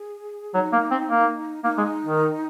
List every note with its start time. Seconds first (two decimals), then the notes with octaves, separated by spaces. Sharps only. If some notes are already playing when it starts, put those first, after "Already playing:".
Already playing: G#4
0.55 F#3 D#4
0.73 A#3
0.91 C4
1.09 A#3
1.64 A#3 D#4
1.78 G#3
2.05 D#3